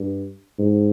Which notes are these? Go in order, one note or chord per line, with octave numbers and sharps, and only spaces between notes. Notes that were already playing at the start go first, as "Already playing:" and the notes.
Already playing: G2
G#2